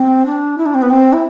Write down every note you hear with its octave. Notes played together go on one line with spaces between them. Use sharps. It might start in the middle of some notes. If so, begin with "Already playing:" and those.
Already playing: C4
D4
E4
D4
C4
B3
C4
E4